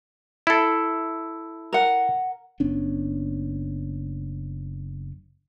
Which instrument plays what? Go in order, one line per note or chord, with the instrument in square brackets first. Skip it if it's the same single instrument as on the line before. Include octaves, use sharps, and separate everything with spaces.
[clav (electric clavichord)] E4 A4
[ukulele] A#4 F#5
[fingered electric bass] F#1 B3 C#4 D4